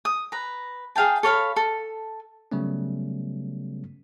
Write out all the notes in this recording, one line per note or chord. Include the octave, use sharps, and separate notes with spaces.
D#6
B4 A#5
G#4 F5 G5 A5
A4 C#5 F5 B5
A4
C#3 F#3 G3 A3 B3 C#4